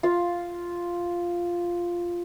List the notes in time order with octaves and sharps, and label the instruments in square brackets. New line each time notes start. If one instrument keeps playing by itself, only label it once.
[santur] F4 F5